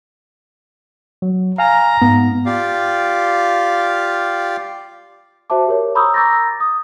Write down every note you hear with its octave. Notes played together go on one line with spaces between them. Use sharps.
F#3
F5 G#5 A#5 F6
G#2 B3
F4 G4 D5 F5
F#4 C5 E5 A5 D6
G4 A#4 C#5
A#5 B5 C#6 D#6 E6 G6
A#5 D6 E6 G6 A6 A#6
D#6